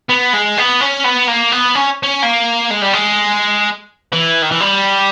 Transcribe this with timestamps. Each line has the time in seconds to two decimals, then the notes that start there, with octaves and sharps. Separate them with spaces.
0.09 B3
0.33 G#3
0.57 B3
0.81 C#4
1.04 B3
1.28 A#3
1.52 B3
1.75 C#4
2.03 C#4
2.23 A#3
2.71 G#3
2.82 G3
2.93 G#3
4.13 E3
4.42 D#3
4.51 E3
4.61 G3